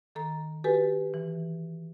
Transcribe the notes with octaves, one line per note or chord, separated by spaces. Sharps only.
D#3 A4 A#5
F#4 G4 A4 B4 G#5
E3